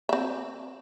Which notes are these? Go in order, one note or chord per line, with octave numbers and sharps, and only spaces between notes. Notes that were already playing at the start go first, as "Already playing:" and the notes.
C4 E5